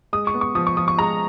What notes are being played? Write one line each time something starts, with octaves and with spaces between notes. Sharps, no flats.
G#3 D#6
C#6
B3
C#6
F3 D#6
C#6
F3 D#6
C#6
G#3 A#5